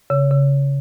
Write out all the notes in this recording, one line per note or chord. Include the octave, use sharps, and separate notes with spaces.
C#3
C#3